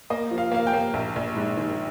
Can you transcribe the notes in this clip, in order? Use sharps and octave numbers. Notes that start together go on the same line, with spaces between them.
A#3 D#5
F3
F5
A#3 F5
G5
A#3
A#1
A#1
G#2
D#3